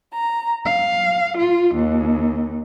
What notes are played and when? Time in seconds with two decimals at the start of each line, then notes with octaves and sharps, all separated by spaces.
0.12 A#5
0.65 F5
1.37 F4
1.74 D#2